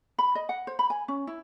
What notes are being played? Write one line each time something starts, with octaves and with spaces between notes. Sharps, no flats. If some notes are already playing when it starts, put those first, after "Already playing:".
B5
D#5
F#5
C5
B5
G#5
C#4
E4